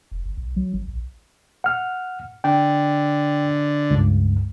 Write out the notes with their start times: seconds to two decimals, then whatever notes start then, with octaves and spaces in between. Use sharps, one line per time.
0.11 F1
0.25 G1
0.37 B1
0.56 F#3
0.74 G#1
0.88 A#1
1.64 F#5 F6
2.44 D3 G5
3.91 C#2 G2